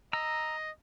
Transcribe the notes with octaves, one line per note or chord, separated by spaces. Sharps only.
D#5 A#5 E6